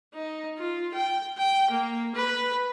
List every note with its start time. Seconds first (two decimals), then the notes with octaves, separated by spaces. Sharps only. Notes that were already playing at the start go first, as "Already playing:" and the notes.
0.14 D#4
0.58 F4
0.94 G5
1.38 G5
1.70 A#3
2.15 B4